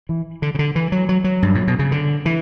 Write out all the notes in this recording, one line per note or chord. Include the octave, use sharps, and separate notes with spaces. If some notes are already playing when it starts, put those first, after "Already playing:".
E3
D3
C#3
D3
E3
F#3
F#3
F#3
G2
A#2
B2
C#3
D3
E3